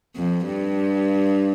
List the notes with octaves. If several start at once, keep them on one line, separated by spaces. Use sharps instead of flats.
F2
G2